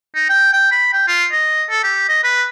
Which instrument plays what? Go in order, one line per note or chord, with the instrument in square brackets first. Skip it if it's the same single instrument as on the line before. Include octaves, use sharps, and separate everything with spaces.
[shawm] D#4
G5
G5
B5
G5
F4
D#5
A4
G4
D#5
B4